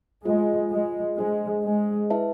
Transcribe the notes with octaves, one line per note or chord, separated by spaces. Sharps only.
G#3 F4 G#4 C5
G#3
G#3 D4 G#4 C5 G#5
G#3
E4 B4 E5 A5